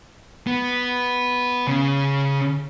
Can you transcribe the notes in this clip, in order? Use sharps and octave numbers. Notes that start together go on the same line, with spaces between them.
B3
C#3